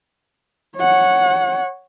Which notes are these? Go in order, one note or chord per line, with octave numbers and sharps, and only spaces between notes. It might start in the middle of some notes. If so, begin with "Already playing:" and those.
C#5 F#5